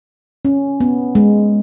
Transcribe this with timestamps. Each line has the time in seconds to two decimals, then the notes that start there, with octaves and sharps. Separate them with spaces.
0.45 C#4
0.80 B3
1.15 G#3